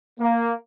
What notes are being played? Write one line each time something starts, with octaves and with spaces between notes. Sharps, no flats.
A#3